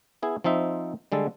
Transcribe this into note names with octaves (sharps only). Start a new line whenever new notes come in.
B3 E4 G#4
F3 C4 D#4 E5
D3 G3 G#3 A4